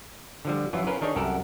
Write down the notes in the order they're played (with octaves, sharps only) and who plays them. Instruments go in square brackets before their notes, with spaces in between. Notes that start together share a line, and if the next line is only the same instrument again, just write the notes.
[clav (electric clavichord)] D3 F3 G3
F#2 E3 F#3 F4
C#4 F4 A#4 B4
D#3 D4 D#4 G#4 C#5
C2 F#2 G4 A4 A#4 F#5